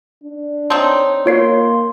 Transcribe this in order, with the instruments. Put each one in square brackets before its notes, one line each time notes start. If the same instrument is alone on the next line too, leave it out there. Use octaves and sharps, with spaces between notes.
[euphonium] D4
[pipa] C4 D#4 [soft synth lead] C#5 [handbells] A5
[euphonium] A#3 [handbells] F4 C#5 C7 [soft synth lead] C6